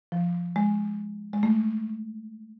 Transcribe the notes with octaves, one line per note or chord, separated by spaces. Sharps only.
F3
G#3
G#3
A3